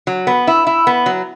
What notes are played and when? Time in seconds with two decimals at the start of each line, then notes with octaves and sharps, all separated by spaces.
0.07 F#3
0.27 B3
0.47 E4
0.67 E4
0.87 B3
1.06 F#3